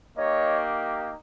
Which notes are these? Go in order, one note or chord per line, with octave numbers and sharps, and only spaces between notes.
A#3 D#4 G4 C#5 D#5